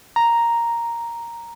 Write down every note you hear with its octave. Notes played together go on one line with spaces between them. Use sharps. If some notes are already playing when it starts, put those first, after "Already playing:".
A#5